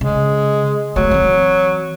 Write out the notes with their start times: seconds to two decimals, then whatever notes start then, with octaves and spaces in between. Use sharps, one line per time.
0.01 C#3 G#3
0.96 F#3 A3 B3
1.11 E3 C4